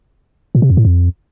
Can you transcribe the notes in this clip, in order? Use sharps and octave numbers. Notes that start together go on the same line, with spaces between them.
A#2
C3
F2
A2
F2